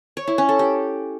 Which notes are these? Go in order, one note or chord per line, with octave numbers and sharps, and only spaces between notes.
C#5
E4
C#4
A4
G4